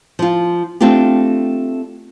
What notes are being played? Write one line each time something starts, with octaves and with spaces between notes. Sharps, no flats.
F3 F4
A3 C4 D4 F4 G4